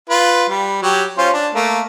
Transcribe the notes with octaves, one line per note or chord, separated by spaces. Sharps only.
F4 B4
G3
F#3 G4
C#4 F4 C5
D4
A3 A#3